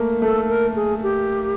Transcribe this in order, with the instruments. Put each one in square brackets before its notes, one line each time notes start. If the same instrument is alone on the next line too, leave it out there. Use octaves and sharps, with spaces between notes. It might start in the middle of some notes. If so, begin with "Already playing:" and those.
Already playing: [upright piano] A3 A#3
[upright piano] A3 [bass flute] A4
[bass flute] A#4
G#4
G4